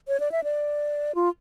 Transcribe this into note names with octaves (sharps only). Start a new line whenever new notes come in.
C#5
D5
E5
D5
F4